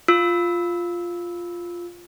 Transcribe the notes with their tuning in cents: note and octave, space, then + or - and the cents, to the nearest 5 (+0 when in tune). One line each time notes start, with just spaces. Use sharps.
F4 +0 E6 -15